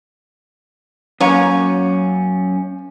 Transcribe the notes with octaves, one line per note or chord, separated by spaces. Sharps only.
F#2 A#3 C#4 C#5 A#5